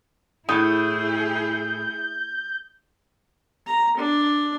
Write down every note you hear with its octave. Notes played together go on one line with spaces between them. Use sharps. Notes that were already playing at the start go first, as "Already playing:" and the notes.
A2 E4 G#4 D#6 G6
A#5
D4